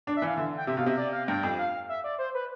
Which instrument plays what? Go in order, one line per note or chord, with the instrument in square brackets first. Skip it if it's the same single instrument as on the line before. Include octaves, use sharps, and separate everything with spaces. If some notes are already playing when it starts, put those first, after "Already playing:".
[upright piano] D4 [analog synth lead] D5
[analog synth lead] E5
[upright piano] E3 [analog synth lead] F5
[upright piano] D3 [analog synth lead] E5
[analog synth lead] G5
[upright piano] C3 [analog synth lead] E5
[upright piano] B2 [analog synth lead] F5
[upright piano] C3 [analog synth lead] E5
[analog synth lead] D5
F5
[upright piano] G2 [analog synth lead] G5
[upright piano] F2
[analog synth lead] F5
E5
D5
C5
B4